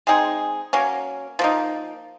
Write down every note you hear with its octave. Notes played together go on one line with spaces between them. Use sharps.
G#3 C4 D#4 G#4
F#3 A#3 C#4
F3 A#3 D#4